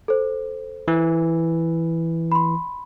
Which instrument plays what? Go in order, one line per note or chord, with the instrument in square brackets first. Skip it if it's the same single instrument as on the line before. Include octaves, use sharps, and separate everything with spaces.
[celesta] A4 C5
[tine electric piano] E3
[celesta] B5 C6